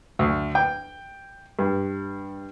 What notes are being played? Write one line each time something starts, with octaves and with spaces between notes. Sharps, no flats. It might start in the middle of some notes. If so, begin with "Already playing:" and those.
D2
G5
G2